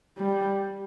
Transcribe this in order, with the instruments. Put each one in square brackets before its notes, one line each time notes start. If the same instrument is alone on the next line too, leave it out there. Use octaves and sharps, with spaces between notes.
[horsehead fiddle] G3